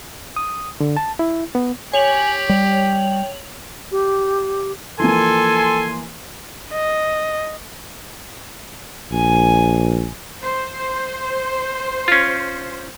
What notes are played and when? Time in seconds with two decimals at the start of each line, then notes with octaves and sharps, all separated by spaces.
0.36 D#6
0.80 D3
0.97 A5
1.19 E4
1.55 B3
1.93 G4 C#5 G#5 F7 F#7
2.49 G3 G5
3.92 G4
5.00 E3 F3 A#3 A4 G#5 C6
6.71 D#5
9.12 A#1 G#5
10.42 C5
12.08 C#4 F4